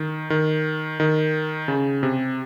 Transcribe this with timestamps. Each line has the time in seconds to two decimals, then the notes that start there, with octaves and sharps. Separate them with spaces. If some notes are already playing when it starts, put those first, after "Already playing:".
Already playing: D#3
0.30 D#3
1.00 D#3
1.68 C#3
2.03 C3